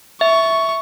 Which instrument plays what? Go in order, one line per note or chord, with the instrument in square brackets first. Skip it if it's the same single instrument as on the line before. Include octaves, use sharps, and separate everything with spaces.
[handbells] E5 [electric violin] C#6